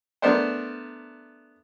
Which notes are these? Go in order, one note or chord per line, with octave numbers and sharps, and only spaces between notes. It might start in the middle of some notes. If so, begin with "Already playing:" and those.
A3 B3 D4 A#4 C5